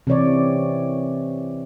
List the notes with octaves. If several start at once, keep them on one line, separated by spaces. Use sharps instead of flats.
C3 E3 C#5 D5